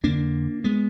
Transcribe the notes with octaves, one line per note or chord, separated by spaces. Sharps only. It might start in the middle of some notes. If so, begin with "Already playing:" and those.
F2 D3 A#3 D4
G#3 B3